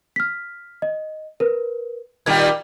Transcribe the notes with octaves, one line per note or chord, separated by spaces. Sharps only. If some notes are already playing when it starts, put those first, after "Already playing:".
F6 B6
D#5
A#4 B4
A#2 D#3 G3 G5 G#6